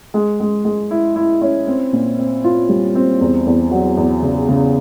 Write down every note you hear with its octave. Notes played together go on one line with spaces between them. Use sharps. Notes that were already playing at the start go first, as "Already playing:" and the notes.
G#3
G#3
G#3
E4
E4
C#4
C4
A#2
C4
F4
G3
C4
E2
E2
F#3
E2
C#3
C#3